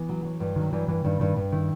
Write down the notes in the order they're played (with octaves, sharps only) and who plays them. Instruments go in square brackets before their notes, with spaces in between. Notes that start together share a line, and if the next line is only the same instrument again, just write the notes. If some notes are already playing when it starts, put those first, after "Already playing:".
Already playing: [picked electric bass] E3 [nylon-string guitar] B3
[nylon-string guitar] F#3
F#3
G2
[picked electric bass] D#3 [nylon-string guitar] F#3
[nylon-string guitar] G2 [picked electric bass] E3
[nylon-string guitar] G2 [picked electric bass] E3
[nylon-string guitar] G2 [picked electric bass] D#3
[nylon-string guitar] G2 [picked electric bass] D#3
[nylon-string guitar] G2
[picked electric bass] D#3 [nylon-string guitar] E4